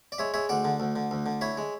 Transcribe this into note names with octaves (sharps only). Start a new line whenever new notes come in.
D5
G#3 C#5 E5
G#3 C#5 E5
D2 D5 F#5
D3
D2
D3
D2
D3
E4 C#5 E5
G#3